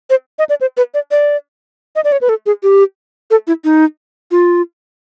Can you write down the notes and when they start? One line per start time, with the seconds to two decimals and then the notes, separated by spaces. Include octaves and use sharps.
0.10 C5
0.39 D#5
0.49 D5
0.61 C5
0.77 B4
0.94 D5
1.11 D5
1.96 D#5
2.04 D5
2.12 C#5
2.21 B4
2.29 A4
2.46 G#4
2.63 G4
3.31 A4
3.47 E4
3.64 D#4
4.31 F4